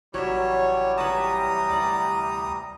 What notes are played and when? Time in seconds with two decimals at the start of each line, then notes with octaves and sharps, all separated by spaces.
0.14 A1 C3 E3 F#3 G3 C#5 E5
0.98 B4 C#5 A5 A#5 D#6
1.69 D2 D5 F#5 D6